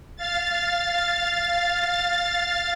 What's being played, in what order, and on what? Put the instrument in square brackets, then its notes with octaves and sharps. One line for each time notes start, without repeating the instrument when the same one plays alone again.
[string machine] F5 A6